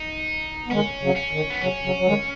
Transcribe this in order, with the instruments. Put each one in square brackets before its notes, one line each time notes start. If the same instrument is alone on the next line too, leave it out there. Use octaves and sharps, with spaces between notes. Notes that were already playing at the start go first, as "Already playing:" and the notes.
Already playing: [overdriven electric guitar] D#4
[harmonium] B3
[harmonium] D#3 G#3 [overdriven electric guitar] C#4
[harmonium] C#3 F#3
[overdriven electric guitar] C#4
[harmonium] D#3
[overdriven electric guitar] B3
[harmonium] C#3 F#3 [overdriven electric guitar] C#4
[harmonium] C#3 F#3
F#3
D#3 G#3